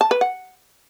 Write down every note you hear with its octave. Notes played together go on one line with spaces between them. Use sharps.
A5
B4
F#5